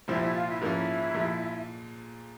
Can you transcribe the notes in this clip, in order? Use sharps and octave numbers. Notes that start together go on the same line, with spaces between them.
C2 A#2 F3 C4 E4 G4 E5
E4 E5
F4 F5
E4 E5
G#2 F3 A#3 C#4 E4 E5
A#2 F3 G#3